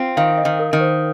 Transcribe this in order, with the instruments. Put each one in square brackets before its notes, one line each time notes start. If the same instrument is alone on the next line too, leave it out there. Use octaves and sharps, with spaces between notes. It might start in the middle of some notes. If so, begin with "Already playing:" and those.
Already playing: [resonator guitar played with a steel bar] C4 F4
[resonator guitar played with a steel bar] D#3 [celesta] F5
[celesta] D#5
[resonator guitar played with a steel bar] D#3
[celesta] A#4
[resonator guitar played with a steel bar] D#3
[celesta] C5